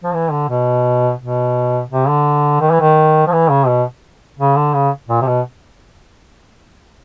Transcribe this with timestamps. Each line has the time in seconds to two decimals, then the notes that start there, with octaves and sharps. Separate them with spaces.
0.03 F3
0.13 E3
0.31 D3
0.49 B2
1.19 B2
1.90 C3
2.08 D3
2.61 D#3
2.71 E3
2.80 D#3
3.27 F3
3.32 E3
3.49 C#3
3.67 B2
4.39 C#3
4.56 D3
4.74 C#3
5.09 A#2
5.22 C3
5.27 B2